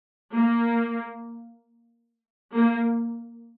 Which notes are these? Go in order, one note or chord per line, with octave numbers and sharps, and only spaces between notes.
A#3
A#3